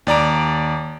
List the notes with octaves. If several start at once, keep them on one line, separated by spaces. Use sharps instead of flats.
D#2 D5 A#5 D7